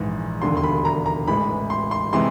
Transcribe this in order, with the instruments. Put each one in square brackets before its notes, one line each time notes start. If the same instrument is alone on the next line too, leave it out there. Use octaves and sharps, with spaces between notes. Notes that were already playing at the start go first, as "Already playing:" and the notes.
Already playing: [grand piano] A#1 G#2 E3 G#3
E1 D#2 D3 G3 C6
C6
B5
A#5
A#5
A1 A2 E3 G#3 B5
C6
C6
C3 E3 G#3 C6